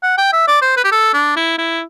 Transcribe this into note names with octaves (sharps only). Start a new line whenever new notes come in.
F#5
G5
E5
D5
C5
B4
G4
A4
D4
E4
E4